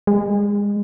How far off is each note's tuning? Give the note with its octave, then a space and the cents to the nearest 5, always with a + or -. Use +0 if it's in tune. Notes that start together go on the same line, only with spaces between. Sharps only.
G#3 -30